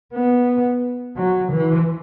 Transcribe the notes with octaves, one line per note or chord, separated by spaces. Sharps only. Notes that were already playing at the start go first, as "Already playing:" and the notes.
B3
F#3
E3